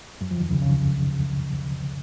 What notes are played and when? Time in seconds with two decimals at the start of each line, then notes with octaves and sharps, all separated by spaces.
0.21 F#2 F#3
0.31 F2 F3
0.41 D#2 D#3
0.51 C#2 C#3
0.62 C#2 C#3